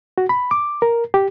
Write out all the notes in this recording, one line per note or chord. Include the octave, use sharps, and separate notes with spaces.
F#4
B5
D6
A#4
G4